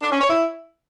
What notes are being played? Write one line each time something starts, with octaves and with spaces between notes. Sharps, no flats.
D4
C#4
C#5
E4